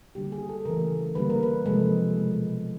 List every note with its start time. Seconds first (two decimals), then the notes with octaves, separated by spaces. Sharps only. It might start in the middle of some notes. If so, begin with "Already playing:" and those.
0.15 D3 G3 A#3 G4
0.32 G#4
0.49 A4
0.65 C#3 E3 A3 A#4
1.15 D3 G3 A#3 B4
1.30 A#4
1.43 B4
1.66 C3 F3 G#3 A4
2.16 B2 G#3